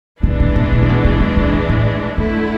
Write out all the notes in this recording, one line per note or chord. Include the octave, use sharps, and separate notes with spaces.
C3 E3 G#3 D4
B2
B2
B2
C3
B2
C3
D3
C3
C3
A2
G#2 D3 A3 E4